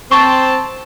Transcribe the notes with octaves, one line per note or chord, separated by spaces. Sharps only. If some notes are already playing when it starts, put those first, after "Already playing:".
C4 A5 C#6